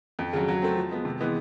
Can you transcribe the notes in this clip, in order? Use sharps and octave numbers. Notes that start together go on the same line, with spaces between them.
F2
C#3 F#3
F#3
A3 C4
F3
G#3 B3
C3
E3 G#3 B3